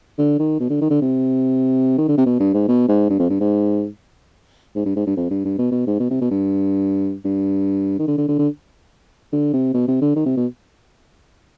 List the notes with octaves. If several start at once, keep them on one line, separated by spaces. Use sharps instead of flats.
D3
D#3
B2
D3
D#3
D3
C3
D#3
D3
C3
B2
G2
G#2
B2
G#2
G2
F2
G2
G#2
G#2
G2
G#2
G2
F2
G2
G2
B2
B2
G#2
B2
C3
B2
G2
G2
D#3
D3
D3
D3
D3
D3
C3
B2
C3
D3
D#3
C3
B2